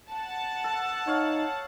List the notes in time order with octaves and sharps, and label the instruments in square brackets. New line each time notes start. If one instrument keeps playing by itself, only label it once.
[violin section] F#5 A5
[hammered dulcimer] A4
[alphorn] D#4 [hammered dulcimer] C#5 F5